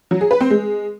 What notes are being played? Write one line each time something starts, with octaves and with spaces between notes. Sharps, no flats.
F#3
G#4
B4
C4
G#3